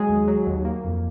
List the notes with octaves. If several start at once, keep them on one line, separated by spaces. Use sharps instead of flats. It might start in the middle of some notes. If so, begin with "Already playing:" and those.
Already playing: F#3 G#3 G#4
D#2
F#3
D#2
A#3
F2